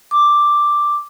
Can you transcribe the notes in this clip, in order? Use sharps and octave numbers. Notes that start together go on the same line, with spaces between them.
D6